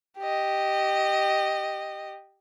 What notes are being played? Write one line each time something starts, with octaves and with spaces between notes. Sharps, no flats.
G4 D#5